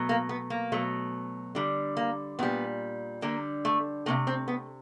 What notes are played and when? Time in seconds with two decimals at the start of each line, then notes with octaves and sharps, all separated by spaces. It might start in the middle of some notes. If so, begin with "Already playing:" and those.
Already playing: B2 F#3 A3
0.09 A#3
0.29 B3
0.50 A#3
0.72 B2 F#3 A3
1.55 D3 G3
1.97 A#3
2.39 A#2 G3 B3
3.22 D3 G3 A#3
3.65 A3
4.06 C3 F3 A3 A#3
4.27 C4
4.48 B3